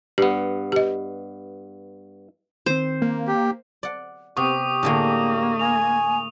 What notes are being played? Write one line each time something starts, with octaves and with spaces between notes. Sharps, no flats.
G2 B3 G4
G4 D#5
D#3 C4 C5
A#3
G4
D5 F#5
C3 B3 G4 C#6 D#6
A2 D3 G#3 A#3
G#5 F7